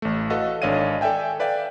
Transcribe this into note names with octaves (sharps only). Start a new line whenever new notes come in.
A1 A3
F#4 A4 B4 D#5 F5
G#1 D4 C#5 D#5 F5 D#7
A4 D5 E5 G5 G#5
B4 D5 E5 F5 G5